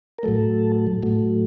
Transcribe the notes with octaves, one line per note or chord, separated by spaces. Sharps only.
A#4
A2 F#3 A3 A4
A2 F#3 A3